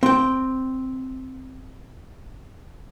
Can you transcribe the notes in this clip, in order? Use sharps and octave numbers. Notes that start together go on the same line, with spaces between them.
C4 G5